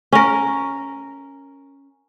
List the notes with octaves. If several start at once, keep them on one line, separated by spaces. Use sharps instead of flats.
C#4 A#4